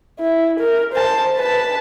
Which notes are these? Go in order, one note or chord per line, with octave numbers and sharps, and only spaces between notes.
E4
A#4
C5 A5
B4 A5